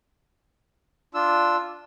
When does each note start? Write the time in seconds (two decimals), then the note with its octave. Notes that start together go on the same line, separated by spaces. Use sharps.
1.14 D4 F4 E6